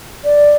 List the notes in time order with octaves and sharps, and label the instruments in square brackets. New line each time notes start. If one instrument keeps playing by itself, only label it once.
[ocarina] D5